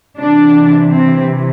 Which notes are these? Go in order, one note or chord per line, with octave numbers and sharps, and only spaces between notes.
C3 E3 D4
C4